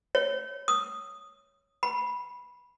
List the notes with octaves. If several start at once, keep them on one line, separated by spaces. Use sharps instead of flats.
C#5
D#6
B5